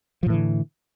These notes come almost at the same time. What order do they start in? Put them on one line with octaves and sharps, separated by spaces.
F3 A2 E3 D3